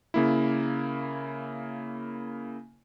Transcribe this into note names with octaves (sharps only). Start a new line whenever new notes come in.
C#3 A#3 E4